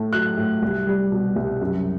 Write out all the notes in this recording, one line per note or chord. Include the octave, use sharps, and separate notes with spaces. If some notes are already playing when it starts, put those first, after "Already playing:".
Already playing: A2 A3
F#3 F#6
A2
C2
G3
B2
C2
F#2